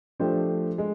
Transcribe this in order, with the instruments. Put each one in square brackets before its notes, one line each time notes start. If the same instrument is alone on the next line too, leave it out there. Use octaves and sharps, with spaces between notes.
[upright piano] F3 A3 D4 G4 C5
G#3